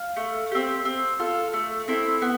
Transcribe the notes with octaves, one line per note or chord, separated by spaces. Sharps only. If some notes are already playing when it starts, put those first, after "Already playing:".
Already playing: F5
A3
C4 G4
C4
F4 A4
A3
C4 E4 A4
B3